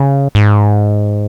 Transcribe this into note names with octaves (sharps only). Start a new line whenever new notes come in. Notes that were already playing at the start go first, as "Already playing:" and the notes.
Already playing: C#3
G#2